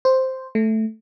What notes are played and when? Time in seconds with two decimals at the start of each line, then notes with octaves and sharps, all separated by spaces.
0.05 C5
0.55 A3